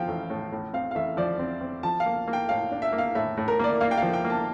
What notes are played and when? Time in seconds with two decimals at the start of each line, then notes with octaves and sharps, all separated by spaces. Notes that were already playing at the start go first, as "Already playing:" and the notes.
Already playing: F3 F5 G5
0.08 A1
0.30 A2
0.52 A2
0.73 C4 F5
0.91 F5
0.95 A1 E5
1.17 F3 D5
1.39 C4
1.61 C4
1.83 F3 A5
2.00 F5
2.06 A#3
2.27 A#3
2.33 G5
2.49 A2 F5
2.72 D4
2.82 E5
2.92 A#3
2.98 F5
3.15 A2 E5
3.37 A2
3.48 A#4
3.59 A#3 D5
3.81 A#3 F5
3.91 G5
3.97 F3 F5
4.13 G5
4.25 A#3
4.30 A5